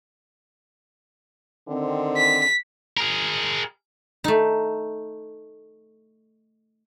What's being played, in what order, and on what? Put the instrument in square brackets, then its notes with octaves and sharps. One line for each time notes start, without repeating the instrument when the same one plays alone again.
[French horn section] D3 D#3 C4
[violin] B6
[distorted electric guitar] G#4 A#4
[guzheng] A3 D#4